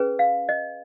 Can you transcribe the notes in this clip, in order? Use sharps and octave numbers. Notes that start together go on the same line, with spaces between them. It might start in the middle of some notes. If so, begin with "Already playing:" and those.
Already playing: C#4 G#4 B4
F5
D#5